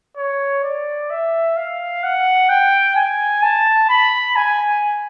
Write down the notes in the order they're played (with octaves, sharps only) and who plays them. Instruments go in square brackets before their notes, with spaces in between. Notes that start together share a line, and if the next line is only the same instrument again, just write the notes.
[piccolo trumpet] C#5
D5
E5
F5
F#5
G5
G#5
A5
B5
G#5